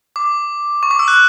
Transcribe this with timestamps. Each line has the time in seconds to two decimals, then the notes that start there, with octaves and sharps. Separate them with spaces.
0.16 D6
0.83 C#6
0.91 D6
0.99 E6
1.08 F#6